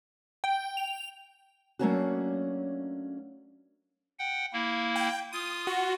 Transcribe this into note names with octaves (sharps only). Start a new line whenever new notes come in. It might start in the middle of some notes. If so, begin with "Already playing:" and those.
G5
F7
F#3 A3 A#3 C#4 D4 F#4
F#5 G5
A#3 E4
G5
F4 D#6
F#4